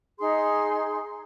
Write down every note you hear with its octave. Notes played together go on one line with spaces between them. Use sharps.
D#4 G#4 C6